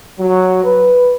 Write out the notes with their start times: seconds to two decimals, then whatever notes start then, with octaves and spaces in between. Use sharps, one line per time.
0.19 F#3
0.63 B4